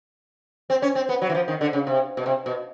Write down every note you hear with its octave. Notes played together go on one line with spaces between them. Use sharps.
C4
C#4
C4
B3
F#3
E3
F3
D#3
D3
C#3
C3
B2
C3
B2